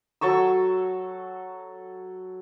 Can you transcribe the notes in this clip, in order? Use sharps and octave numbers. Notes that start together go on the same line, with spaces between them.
F#3 A4 C#6 E6